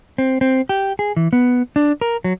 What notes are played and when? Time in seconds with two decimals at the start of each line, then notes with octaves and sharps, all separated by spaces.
0.18 C4
0.41 C4
0.69 G4
0.99 G#4
1.17 E3
1.33 B3
1.76 D4
2.01 A#4
2.24 F#3